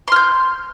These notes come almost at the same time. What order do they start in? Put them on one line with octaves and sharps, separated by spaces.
C6 F6 G6